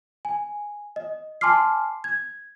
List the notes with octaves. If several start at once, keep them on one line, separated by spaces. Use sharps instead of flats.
G#5
D#5
G#5 A5 C6 D6 F6 C7
G#6